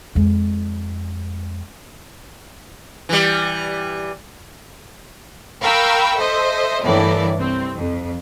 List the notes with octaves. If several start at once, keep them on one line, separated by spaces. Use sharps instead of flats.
F2 G#3
E3 G3
A#4 F5 G5 B5 C#6 E6
A4 C5 D#5 E5
G1 A2 E3 A#3 E4 D5
C2 C4
F2